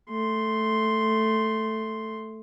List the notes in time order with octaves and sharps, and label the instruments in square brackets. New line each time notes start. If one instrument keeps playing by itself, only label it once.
[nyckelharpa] A3 C6